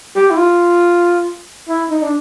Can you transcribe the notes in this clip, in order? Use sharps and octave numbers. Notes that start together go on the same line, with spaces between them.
G4
E4
F4
E4
D#4
D4